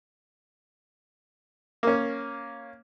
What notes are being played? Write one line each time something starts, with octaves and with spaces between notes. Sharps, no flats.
A#3 C#4